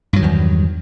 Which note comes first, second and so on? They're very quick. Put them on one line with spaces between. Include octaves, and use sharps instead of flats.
G2 F#3 D#3 E2